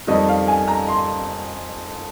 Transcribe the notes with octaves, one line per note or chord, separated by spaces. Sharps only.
F2 D#3 G3 D#5
F5
G#5
A#5
C6